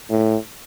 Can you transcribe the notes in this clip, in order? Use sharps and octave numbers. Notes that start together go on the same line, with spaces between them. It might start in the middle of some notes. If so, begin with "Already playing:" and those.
A2